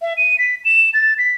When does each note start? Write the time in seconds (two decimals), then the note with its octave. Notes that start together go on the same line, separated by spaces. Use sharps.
0.02 E5
0.17 D#7
0.38 B6
0.65 E7
0.94 A6
1.18 B6